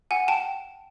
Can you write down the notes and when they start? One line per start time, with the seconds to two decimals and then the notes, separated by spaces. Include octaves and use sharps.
0.11 F#5 G#5
0.28 G5 A5